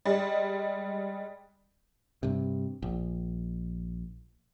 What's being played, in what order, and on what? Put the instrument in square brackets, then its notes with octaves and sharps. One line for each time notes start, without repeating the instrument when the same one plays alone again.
[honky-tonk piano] G3 G#3
[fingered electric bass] G2 C3
A#1